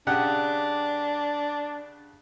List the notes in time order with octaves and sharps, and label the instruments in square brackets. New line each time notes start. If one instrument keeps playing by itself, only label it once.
[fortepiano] C#3 G4 F#5 [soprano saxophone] D4